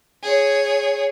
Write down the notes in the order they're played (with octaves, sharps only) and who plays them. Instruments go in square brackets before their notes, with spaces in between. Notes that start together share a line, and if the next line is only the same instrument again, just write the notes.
[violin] G#4 C#5